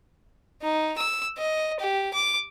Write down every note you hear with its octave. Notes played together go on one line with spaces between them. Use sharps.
D#4
E6
D#5
G4
D6